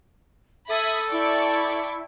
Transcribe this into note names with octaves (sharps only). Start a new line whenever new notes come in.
A4 E5 B5 D#6 G#6
E4 D5 G5 A5 C#6 D6